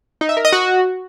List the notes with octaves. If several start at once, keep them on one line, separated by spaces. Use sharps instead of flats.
D#4
E5
A#4
D#5
F#4